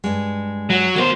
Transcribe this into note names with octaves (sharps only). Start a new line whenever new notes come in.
G2 G#3
F#3
F#3 B3 A#4 C5